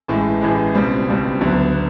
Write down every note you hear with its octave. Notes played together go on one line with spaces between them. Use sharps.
A1 A2 E3 G#3
A1 A2 E3 G#3
C#2 B2 G3 C4
C#2 B2 G3 C4
D2 D3 F#3 B3
B3